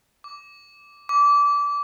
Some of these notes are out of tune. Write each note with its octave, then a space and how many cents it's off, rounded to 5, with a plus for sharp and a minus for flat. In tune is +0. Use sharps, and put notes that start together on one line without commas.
D6 -10
D6 -25